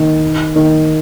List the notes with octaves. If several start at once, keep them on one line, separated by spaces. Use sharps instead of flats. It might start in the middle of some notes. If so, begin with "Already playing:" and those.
Already playing: D#3
D#3